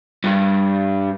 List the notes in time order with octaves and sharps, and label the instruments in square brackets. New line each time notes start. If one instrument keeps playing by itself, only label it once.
[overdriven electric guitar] G2